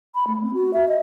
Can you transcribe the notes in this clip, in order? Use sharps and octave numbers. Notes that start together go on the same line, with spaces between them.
B5
A3
C4
F#4
E5
D#5